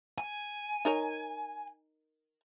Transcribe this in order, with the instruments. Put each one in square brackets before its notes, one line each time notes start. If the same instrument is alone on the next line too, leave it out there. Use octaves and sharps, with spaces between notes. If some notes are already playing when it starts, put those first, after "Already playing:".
[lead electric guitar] G#5
[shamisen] D#4 A#4 C#5